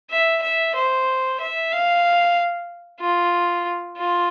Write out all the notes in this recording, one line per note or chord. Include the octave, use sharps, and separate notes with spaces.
E5
E5
C5
E5
F5
F4
F4